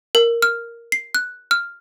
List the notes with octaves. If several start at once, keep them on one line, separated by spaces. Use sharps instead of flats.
A#4
F6
C7
F#6
F6